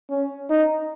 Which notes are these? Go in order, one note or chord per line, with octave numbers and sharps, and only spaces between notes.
C#4
D#4